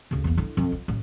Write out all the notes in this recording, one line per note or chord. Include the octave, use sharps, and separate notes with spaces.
D2 C#3
E2 A#3
D3 E4
F2
F4
A1